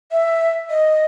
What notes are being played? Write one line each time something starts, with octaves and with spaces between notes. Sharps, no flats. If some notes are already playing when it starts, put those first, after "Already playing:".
E5
D#5